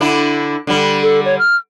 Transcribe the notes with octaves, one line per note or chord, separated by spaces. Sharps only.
D3 D4 E4
D3 G3
A4
C#5
F6